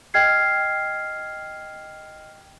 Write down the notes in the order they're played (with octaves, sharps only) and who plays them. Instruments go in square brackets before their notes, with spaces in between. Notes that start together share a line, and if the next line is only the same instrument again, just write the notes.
[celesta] D#5 G5 F6 G#6 C7